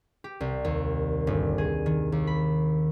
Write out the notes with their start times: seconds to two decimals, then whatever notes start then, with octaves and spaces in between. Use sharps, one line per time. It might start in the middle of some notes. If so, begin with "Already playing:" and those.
0.24 G4
0.41 C2
0.65 D#2
1.27 G1
1.58 G#4
1.86 D#3
2.12 D#2
2.27 B5